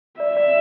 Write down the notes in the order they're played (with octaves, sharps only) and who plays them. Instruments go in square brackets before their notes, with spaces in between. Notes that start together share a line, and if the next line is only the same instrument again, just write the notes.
[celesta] D5 [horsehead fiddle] E5
[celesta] D5